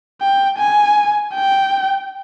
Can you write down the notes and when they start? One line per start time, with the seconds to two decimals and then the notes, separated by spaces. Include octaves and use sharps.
0.21 G5
0.58 G#5
1.34 G5